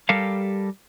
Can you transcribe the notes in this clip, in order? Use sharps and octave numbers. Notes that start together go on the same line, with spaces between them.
G3 G4 A4 A#4 F5